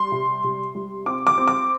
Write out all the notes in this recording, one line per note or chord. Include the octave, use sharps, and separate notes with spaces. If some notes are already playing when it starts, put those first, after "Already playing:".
Already playing: G3 C6
C3
C3
G3
C4 D6
D6
C4
D6